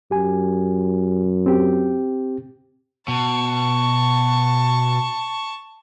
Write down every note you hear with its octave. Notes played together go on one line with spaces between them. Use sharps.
F#2 G4 G#5
C4 G4 G5
B2 A5 C#6